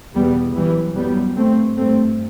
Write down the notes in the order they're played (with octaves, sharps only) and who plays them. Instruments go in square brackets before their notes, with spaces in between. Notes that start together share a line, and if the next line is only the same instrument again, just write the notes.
[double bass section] E2 B2 G3 B3
F#2 E3 G3
F#2 G3 B3
G2 A3 C4
G2 A3 C4